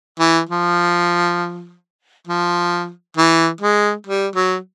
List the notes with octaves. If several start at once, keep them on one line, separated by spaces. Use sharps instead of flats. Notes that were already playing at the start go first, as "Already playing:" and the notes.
E3
F3
F3
E3
G#3
G3
F#3